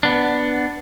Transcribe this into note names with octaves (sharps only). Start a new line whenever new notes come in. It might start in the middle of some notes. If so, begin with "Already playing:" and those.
B3 D4